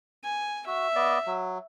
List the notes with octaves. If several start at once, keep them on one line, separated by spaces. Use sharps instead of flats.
G#5
F#4 E5
B3 D5 D#5
F#3